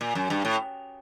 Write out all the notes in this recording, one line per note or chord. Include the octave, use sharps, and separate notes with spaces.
A#2
F#2
G2
A2